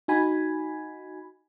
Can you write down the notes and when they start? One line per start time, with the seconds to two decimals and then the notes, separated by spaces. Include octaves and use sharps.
0.08 D#4 F#4 G#5 B5